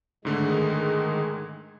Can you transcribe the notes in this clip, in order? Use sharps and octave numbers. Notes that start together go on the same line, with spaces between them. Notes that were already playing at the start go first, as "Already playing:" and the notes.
G#2 D3 D#3 G#3 A3